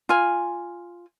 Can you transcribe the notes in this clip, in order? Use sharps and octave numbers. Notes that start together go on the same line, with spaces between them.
F4 G#5